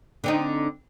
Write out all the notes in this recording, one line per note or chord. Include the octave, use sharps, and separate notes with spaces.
D3 C4 D#4